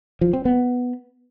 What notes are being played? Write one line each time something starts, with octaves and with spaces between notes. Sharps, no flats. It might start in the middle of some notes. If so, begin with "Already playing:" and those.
F3
C4
B3